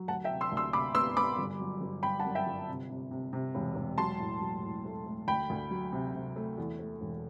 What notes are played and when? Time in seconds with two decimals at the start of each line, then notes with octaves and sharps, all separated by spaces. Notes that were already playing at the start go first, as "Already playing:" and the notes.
Already playing: F#3
0.08 D2 F#5 A5
0.24 E5 G5
0.30 C3
0.41 C6 E6
0.52 D2
0.57 C6 E6
0.73 C3 B5 D6
0.95 B3 C6 E6
1.17 B3 B5 D6
1.39 G1
1.60 F#3
1.81 G1
2.03 G1 G5 B5
2.19 F#5 A5
2.25 F#2
2.35 E5 G5
2.47 G1
2.68 C3
2.90 C3
3.11 C3
3.33 C3
3.55 E1
3.76 E1
3.98 F#3 A5 C6
4.20 A2
4.41 F#3
4.63 A2
4.85 A3
5.06 A3
5.28 D2 G5 B5
5.50 D2
5.71 F#3
5.92 C3
6.15 C3
6.36 A3
6.58 E2
6.79 A3
7.01 E1